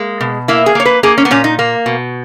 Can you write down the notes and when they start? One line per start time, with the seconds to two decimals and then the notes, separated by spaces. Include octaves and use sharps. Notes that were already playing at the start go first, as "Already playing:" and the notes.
Already playing: G#3 A#3
0.21 B2
0.48 A#3 E4
0.66 G#4
0.75 A#3 C#5
0.86 B4
1.03 A#3 G#4
1.18 C#4
1.25 B3
1.31 A#2 C#4
1.44 D#4
1.59 A#3
1.86 B2